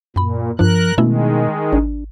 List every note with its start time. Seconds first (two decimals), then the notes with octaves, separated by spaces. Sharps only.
0.16 F#2 A#2 B5
0.59 G2 F3 D4 A#4 F#6
0.98 B2 D#3 G#3 A3 C#4 E4
1.72 G#1 D4